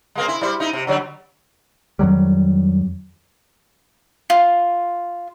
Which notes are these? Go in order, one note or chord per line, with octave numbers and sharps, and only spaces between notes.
G#3 A#3 C4
E4
G3 E4 C5
D#4 E4
C3
D3 F#3 G3
F2 D#3 F#3 G3
F4